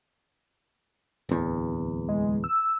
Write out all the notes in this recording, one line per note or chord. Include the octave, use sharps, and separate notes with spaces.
D1 E2
G#3
E6